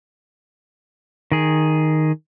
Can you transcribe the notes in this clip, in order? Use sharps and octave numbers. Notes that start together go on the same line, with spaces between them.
D#3 G#4